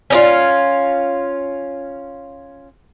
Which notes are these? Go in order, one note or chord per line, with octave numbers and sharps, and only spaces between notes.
C#4 D#4 F4